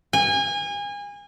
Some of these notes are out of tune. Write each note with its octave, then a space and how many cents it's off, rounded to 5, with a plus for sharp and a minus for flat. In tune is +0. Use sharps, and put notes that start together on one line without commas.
G#5 -30